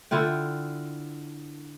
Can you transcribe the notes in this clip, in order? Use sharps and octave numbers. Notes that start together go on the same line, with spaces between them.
D3 E4 F4 G5